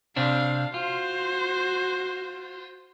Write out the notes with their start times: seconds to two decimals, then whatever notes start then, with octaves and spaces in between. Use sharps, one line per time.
0.16 C3 C4 D4 F5
0.74 F4 F#4 C5